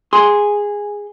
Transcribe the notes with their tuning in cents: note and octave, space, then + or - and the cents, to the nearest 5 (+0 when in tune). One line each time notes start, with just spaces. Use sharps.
G#4 -10 C6 +0